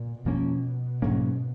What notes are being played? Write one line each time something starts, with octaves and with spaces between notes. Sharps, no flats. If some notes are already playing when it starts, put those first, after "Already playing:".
Already playing: A#2
F2 B2 F3 A#3 C#4
G#2 F#3 A#3 C#4